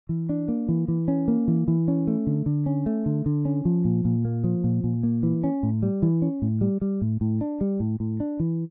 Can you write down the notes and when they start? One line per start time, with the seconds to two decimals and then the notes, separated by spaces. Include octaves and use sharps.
0.09 E3
0.29 D4
0.48 A#3
0.69 E3
0.88 E3
1.08 C#4
1.28 A#3
1.48 E3
1.68 E3
1.88 C#4
2.07 A3
2.27 D3
2.46 D3
2.66 C#4
2.86 A3
3.06 D3
3.26 D3
3.45 C#4
3.65 F3
3.85 A#2
4.05 A#2
4.25 A#3
4.44 F3
4.64 A#2
4.84 A#2
5.03 A#3
5.23 E3
5.44 C#4
5.63 A2
5.83 G3
6.02 E3
6.22 C#4
6.42 A2
6.61 G3
6.81 G3
7.02 A2
7.21 A2
7.41 D4
7.61 G3
7.80 A2
8.00 A2
8.20 D4
8.40 E3